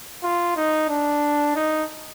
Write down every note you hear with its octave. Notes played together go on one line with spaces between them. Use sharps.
F4
D#4
D4
D#4